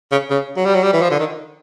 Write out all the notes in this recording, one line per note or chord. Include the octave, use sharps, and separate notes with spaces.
C#3
C#3
F#3
G3
F#3
G3
E3
F3
D3
D#3